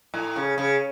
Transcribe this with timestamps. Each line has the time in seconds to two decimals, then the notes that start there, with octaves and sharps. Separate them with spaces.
0.14 A2
0.36 C#3
0.58 C#3